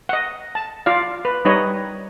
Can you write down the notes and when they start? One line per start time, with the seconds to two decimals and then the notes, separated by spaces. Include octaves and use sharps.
0.09 D#5 F#5
0.55 A5
0.86 F4 D5 F5
1.25 B4
1.45 G3 D#4 B4 C#5 D#5